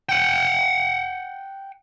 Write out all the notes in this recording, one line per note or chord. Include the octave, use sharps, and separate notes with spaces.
F#5 G5